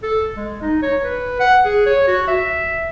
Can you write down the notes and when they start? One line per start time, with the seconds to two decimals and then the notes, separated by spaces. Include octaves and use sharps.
0.03 A4
0.36 G#3
0.61 D#4
0.82 C#5
1.03 B4
1.40 F#5
1.65 G#4
1.86 C#5
2.07 F#4
2.28 E5